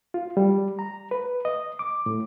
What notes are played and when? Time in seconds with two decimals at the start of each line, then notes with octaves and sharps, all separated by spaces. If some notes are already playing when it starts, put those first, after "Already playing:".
0.14 F4
0.37 G3
0.79 A#5
1.11 B4
1.45 D#5
1.79 D6
2.06 A2